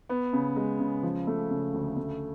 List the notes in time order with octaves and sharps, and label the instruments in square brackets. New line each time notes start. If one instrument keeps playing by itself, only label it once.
[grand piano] B3
C#3
G#3
C#3
F3
A3
C#3
D2
A3